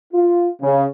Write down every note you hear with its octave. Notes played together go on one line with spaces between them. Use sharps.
F4
C#3